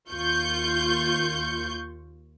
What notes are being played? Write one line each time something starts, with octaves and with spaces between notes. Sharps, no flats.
D#2 F4 C#6 G6